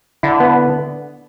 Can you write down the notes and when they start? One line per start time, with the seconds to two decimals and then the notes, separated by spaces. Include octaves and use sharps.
0.23 D3 E4
0.40 B3